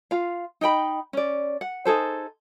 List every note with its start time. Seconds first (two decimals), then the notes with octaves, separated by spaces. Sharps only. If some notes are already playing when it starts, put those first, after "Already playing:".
0.11 F4 F5
0.61 D#4 D#5 G5 B5
1.13 C#4 D5
1.61 F#5
1.85 D#4 G#4 A4 C5